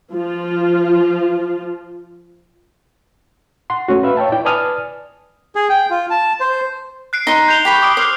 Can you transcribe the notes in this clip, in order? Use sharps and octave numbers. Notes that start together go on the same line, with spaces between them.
F3 F4
F#5 C6
A3 C#4 F#4
B4 E5 F5
C#5 E5 G5 A5
E4 D5 G5
B4 D5 G#5 A5 D#6 F6
G#4
G5
F4
A5
C5
F#6 C7 D7
D#4 C6
G6 F7 G7
G4 B5 C#6
D6 D#6 D7
C5 D6 F6 F#6